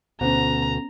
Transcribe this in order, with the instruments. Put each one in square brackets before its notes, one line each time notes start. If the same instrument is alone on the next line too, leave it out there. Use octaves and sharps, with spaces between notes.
[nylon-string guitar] D2 B2 [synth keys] B3 C#4 [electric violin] A#5